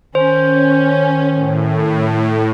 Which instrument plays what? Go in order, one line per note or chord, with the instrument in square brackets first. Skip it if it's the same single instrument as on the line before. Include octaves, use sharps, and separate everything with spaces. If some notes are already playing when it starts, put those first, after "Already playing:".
[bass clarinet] D#3 [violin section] C#4 [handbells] C5
[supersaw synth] A2